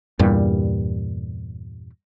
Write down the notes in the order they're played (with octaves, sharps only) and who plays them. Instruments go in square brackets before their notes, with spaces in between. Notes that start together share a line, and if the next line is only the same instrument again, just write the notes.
[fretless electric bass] E2 G2 A#2 G3